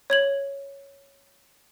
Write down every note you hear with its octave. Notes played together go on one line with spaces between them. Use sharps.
C#5 G#6 F#7